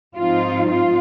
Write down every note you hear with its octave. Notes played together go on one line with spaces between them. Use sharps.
G#2 F3 C4 D#4 F4
F4